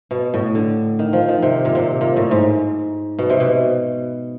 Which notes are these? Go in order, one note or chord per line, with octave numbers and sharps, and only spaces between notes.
B2
A2
D3
D#3
F3
D#3
C3
A#2
C3
A#2
A2
G#2
B2
C3
B2